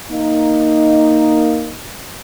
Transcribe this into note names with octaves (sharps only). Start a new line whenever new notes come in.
A#3 D#4